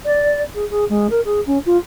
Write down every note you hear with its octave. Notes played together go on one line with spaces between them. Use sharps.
D5
G#4
G#4
G#3
A#4
G#4
C#4
F4